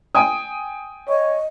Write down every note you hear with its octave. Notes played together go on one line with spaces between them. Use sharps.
G5 G#5 D#6
C#5 D#5